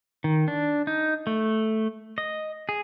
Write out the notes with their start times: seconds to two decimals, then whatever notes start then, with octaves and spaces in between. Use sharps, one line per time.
0.24 D#3
0.48 D4
0.87 D#4
1.27 A3
2.18 D#5
2.69 G#4